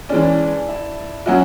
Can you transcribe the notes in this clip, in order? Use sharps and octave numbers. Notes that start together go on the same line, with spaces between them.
E3 G#3 C#4 D4 D5
E4 E5
F#3 C#4 E4 F#4 E5